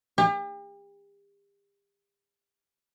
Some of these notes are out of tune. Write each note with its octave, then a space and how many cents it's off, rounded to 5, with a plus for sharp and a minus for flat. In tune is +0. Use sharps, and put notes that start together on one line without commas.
G4 +40